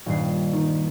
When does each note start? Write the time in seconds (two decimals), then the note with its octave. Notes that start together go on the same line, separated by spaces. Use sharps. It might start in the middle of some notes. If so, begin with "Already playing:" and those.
0.06 D#1 G2 C7
0.53 D#3